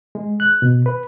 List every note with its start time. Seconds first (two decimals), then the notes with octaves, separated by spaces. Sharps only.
0.15 G#3
0.40 F#6
0.62 B2
0.86 B4